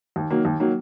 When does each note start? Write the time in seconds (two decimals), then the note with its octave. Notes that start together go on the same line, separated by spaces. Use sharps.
0.16 D#2
0.31 D#3 F#3 A#3
0.45 D#2
0.60 D#3 F#3 A#3